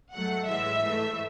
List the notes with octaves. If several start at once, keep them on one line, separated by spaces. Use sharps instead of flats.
G#2 F#3 A3 F#5
A2 E3 G#3 E5
G#2 E3 A3